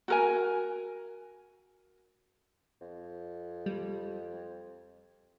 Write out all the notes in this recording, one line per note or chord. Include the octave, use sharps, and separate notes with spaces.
F#4 A#4 G#5
F2
G3